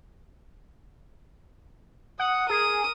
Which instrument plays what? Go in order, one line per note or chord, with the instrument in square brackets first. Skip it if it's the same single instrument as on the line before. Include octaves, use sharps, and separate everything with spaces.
[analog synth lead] F#5 [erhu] D#6
[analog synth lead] G#4 [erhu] A#4 [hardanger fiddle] D#6